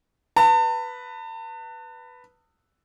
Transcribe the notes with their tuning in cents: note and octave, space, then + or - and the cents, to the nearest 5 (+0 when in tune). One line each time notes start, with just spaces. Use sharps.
B4 +0 A5 +40